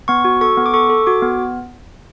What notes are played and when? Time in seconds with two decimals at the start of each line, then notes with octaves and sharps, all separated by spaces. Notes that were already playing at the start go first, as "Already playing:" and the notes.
0.08 B3 C#6
0.25 F#4
0.41 A4 C#6
0.57 B3
0.66 D6
0.74 A4 C#6
0.90 A4
1.06 F#4 D6
1.22 B3